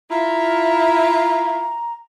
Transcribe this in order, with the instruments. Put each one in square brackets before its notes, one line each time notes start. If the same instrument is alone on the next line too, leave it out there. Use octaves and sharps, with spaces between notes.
[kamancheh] E4 [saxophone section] F4 [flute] A#5